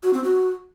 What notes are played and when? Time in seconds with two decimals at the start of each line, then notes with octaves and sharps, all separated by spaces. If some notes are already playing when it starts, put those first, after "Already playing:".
0.03 F#4
0.14 C4
0.24 F#4